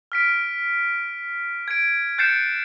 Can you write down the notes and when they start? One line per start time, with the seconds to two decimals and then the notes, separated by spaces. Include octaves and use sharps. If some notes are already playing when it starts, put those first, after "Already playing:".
0.12 F6 B6 D7
1.68 G#6 D7
2.18 F#6 G6 A6 C7 C#7 E7